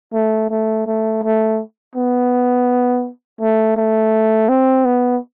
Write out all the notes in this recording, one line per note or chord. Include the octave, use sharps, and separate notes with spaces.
A3
A3
A3
A3
B3
A3
A3
C4
B3